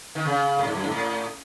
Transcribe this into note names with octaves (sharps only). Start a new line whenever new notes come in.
D#3
C#3
A2
G#2
F#2
G#2
A2